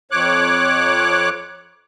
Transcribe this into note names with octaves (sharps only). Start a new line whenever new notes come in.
F2 C#5 D6 F#6